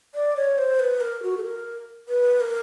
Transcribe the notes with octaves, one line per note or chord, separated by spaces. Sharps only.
D5
C#5
C5
B4
A#4
F#4
A4
A#4
B4
A#4